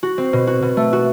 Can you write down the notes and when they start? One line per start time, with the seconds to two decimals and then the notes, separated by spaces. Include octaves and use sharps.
0.03 F#4
0.18 C4
0.33 B2
0.47 F#4
0.62 B2
0.77 A3
0.93 F#4